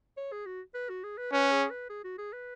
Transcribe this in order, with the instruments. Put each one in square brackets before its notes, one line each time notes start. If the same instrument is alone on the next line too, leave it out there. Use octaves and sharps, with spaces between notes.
[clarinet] C#5
G#4
F#4
B4
F#4
G#4
B4
[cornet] C#4 [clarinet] B4
[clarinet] G#4
B4
G#4
F#4
G#4
B4